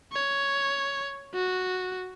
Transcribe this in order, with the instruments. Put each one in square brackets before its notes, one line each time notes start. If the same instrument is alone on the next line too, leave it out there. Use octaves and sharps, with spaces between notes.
[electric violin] C#5
F#4